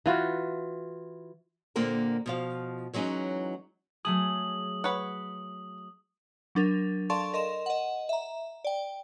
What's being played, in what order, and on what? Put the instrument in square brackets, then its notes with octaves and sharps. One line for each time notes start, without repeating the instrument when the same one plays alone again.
[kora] E3 F4 F#4
[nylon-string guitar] A#2 D3 A#3 C4 A#4
B2 F3 F5
E3 F#3 G#3 C#4 D#4
[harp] F#3 A3 G#4 [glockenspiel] D#6 F#7
[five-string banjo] B4 C#5 F#5
[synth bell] F#3 D4 A#4
A4 D5 F5 A5 C6 C#6
A#4 D#5 C6 E7
D#5 F#5
E5 A#5
D5 G5